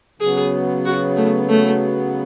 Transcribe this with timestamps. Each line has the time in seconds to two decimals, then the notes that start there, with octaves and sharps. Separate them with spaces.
0.20 C#3 F#3 B3 G#4
0.85 F#4
1.17 A3
1.49 A3